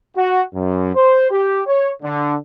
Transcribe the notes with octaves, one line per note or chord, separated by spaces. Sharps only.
F#4
F#2
C5
G4
C#5
D3